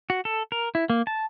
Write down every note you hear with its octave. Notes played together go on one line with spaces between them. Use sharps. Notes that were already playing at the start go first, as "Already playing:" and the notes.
F#4
A4
A#4
E4
A#3
A5